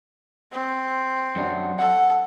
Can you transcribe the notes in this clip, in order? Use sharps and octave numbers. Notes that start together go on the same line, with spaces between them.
C4
F#2 D4 F#4
A4 F#5